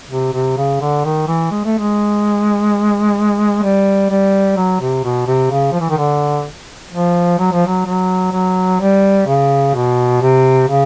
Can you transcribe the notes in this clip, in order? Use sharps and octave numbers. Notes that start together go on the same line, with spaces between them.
C3
C3
C#3
D3
D#3
E3
G#3
A3
G#3
G3
G3
F#3
C3
B2
C3
C#3
F3
E3
D#3
D3
F3
F#3
F3
F#3
F#3
F#3
G3
C#3
B2
C3
C#3